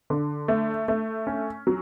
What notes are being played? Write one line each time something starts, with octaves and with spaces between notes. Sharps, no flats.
D3
A3
A3
C#4
F#3